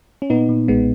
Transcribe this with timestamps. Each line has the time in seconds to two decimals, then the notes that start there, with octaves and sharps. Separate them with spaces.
0.22 C#4
0.30 A#2 B3 D#4
0.49 A#2
0.68 B1 G#3 B3